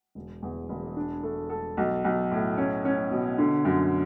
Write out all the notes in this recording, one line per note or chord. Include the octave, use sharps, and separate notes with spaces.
E1
E2
E1
D4
A3
A4
B1
B1
A2
C#4
C#4
B2
D3
F#2